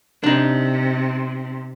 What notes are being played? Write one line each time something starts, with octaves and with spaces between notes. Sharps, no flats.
C3 D4 D#4